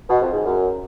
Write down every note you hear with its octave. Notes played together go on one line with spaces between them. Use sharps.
B2
F2
G#2
F#2